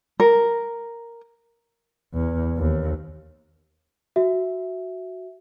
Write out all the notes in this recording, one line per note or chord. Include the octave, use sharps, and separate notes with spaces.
A#4
E2
D#2
F#4 E5